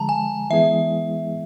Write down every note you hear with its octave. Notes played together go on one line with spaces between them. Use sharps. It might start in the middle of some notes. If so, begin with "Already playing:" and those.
Already playing: D3 F3 G#3 A5 A#5
G#5
E3 G#3 B3 E4 G#4 E5